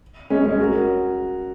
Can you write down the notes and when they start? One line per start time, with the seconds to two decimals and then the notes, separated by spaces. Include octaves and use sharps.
0.30 G#3 C#4
0.45 G#3 C#4
0.60 F#4 A#4